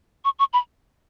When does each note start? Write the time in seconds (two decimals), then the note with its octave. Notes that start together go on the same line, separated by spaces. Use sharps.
0.25 C#6
0.39 C#6
0.53 B5